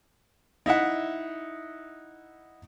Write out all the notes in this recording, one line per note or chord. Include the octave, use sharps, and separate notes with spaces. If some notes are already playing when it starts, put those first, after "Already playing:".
D#4 E4 E5 F#5